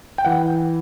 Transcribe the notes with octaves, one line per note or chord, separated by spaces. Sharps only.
G5
E3 F#5